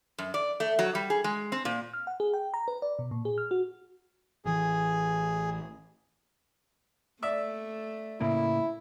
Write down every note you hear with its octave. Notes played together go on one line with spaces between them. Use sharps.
F#2
D5
A3
F#3
G3
G#4
G#3
C4
A#2
F6
F#5
G#4
G5
A#5
B4
D5
B2
A#2
G#4
F6
F#4
A1 E3 G#4
A3 D5 E5
A2 C#3 A#3 E4